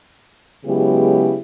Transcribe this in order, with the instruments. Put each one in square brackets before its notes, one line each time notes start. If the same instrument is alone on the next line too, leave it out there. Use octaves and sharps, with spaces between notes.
[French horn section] C#3 F#3 G#3 B3 E4 G4